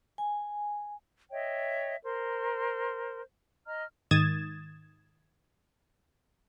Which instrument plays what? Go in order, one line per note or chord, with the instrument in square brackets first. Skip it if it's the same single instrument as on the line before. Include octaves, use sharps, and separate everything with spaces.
[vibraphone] G#5
[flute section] C#5 D#5 E5 G5
A#4 C5 C6
D#5 A#5 F6
[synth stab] G#2 D#3 D#6 G#6 A6 E7